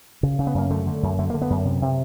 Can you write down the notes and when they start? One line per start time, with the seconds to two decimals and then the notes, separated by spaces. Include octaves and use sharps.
0.23 C#3
0.39 C#3
0.47 B3
0.54 F#2 A#3
0.70 D3 A3
0.87 D3
1.03 F#2
1.19 D3 A3
1.30 D3 A#3
1.42 B3
1.50 F#2
1.65 C3
1.82 C3